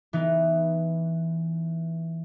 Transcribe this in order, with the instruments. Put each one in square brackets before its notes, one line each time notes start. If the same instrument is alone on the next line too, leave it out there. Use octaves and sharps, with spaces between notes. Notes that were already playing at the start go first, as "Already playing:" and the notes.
[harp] E3 B3 D#4